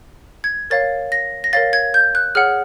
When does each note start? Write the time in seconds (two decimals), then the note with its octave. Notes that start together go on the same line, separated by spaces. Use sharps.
0.44 G#6
0.70 A#4 C#5 F5 A6
1.12 A#6
1.44 A#6
1.53 A#4 C#5 F5 A6
1.73 G#6
1.94 G6
2.15 F#6
2.35 G#4 C#5 F#5 F6